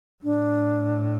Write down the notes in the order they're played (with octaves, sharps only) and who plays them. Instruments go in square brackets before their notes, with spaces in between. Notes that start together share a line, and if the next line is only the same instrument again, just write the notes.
[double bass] A2 [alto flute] D4